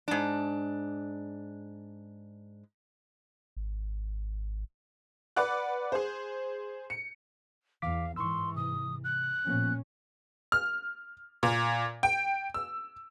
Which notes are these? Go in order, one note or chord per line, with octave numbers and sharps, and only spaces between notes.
G#2 D4
G#1
B4 D5 F#5 D6 F#6
G#4 C5
C#7
E2 E3 F5 D6 B6
G#2 E3 C6 C#6 E6
C3 D#6
F#6
A#2 F3 A#3 B3 C#4
F6
A#2
G5
E6